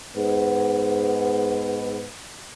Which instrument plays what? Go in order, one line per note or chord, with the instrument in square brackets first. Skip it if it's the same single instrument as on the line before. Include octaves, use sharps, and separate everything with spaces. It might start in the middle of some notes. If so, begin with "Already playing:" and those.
[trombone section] G#2 B3